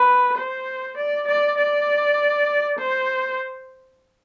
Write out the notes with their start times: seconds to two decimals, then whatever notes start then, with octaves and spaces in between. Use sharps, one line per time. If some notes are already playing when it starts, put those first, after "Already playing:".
Already playing: B4
0.37 C5
0.97 D5
1.27 D5
1.58 D5
2.78 C5